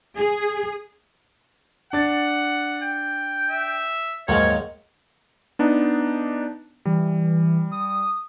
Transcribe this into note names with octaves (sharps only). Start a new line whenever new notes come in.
G#4
D4 F#5 A6
G5
E5
D#2 G#2 F3 F#3 G#3 A#4 C#5
B3 D4 D#4
E3 G3
D#6